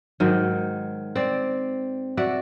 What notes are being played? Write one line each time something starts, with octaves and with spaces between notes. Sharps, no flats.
G#2 D#3 F#3
C4 D5
F#4 D5 E5